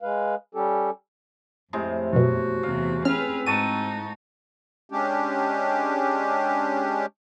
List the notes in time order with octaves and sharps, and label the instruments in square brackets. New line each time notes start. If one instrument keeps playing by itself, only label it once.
[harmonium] G#3 B4 F5
G3 C#4 G4 A4
[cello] F2 [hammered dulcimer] A2 C3 G#3
[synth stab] F#2 B2 [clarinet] F#4
[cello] E2 C3 [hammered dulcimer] F5
[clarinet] C4 [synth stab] C#4 F6 [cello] G#4 B4
[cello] G#2 D#4 [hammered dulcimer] F#4 A5 C#6 [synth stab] D#7
[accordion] G#3 C#4 D4 G4